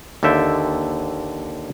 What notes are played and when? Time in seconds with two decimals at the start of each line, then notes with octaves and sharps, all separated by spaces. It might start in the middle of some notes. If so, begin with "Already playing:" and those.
0.23 D#2 D3 A4 E5 G5